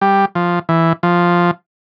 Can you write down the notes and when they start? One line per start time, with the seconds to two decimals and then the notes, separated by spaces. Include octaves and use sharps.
0.01 G3
0.35 F3
0.69 E3
1.03 F3